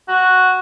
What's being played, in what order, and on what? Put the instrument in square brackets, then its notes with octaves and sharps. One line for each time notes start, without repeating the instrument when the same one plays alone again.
[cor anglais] F#4